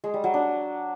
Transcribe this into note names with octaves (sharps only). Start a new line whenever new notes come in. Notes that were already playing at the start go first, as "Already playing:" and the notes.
G#3
G3
F#3
D4